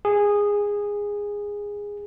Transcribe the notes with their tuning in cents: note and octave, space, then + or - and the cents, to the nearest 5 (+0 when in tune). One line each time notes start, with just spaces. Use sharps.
G#4 -15